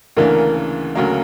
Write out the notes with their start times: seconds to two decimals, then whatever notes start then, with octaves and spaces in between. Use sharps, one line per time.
0.17 D2 C#3 E3 A#3 D4 A#4
0.95 D2 C#3 F#3 A#3